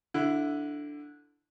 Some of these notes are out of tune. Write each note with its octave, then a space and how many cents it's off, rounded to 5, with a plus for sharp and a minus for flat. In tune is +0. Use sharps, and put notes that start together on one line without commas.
D3 +0 E4 +10